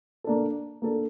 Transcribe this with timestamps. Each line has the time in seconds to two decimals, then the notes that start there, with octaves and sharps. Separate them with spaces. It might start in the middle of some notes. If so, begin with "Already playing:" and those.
0.24 A#3 D4 A4
0.82 A#3 D4 A4